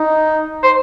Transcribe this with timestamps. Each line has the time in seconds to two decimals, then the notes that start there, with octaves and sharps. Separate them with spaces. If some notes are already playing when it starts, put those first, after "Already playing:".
Already playing: D#4
0.63 C5